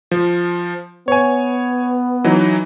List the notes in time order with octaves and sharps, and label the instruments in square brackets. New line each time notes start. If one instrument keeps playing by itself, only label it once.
[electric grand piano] F3
[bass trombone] B3 [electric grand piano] C#5 G#5
[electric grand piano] E3 F#3 D#4